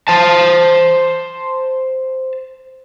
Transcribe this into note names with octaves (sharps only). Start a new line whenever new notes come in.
C5 A5